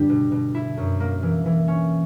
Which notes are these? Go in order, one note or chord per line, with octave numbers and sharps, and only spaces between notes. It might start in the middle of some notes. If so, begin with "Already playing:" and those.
Already playing: G2 D3 G3 G4
B2
B2
E4
F#2
A#3
E3
E3
C#4